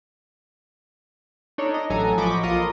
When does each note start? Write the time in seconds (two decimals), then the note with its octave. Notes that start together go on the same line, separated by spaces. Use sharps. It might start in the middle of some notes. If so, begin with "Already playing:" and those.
1.58 D4 D#4 A4 C#5
1.74 D#5
1.90 A1 F#3 A4 G#5 A#5
2.18 F3 D#5 B5 C#6 D6
2.43 A#1 F4 A#4 D#5 D#6